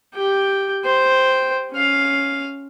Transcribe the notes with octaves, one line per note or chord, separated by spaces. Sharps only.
G4 G5
C5 G5
C#4 F5